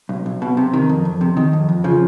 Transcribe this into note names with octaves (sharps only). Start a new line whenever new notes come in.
B1
B1
B2
C3
D#3
F2
F2
C3
D#3
F2
F2
C#3 F3